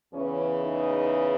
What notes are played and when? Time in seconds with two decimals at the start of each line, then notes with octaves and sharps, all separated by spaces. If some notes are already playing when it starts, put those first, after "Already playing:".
0.12 E2 C#3 E3 C#4
0.62 D#4